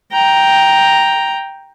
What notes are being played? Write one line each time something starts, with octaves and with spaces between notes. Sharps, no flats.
G5 A#5